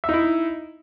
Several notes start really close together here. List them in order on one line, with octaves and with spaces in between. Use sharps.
E5 D#4 E4